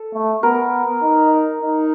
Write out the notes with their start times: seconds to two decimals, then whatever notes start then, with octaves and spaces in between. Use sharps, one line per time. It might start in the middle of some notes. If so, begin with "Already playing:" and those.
Already playing: A4
0.14 A3
0.43 B3 A#4
1.03 D#4
1.62 D#4